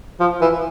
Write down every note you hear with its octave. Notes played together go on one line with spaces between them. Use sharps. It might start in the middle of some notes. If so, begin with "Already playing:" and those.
F3
E3